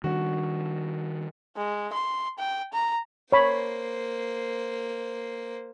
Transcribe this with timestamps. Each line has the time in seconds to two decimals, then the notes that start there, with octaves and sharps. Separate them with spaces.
0.04 D#3 G3 D4 F#4
1.57 G#3
1.93 C6
2.39 G5
2.73 A#5
3.32 A#3 C5 C#5 B5